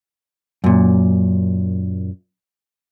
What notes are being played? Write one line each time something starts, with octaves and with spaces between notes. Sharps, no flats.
F#2 A#2